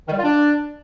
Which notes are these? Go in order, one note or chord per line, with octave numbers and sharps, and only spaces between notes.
D#3
G3
F4
D4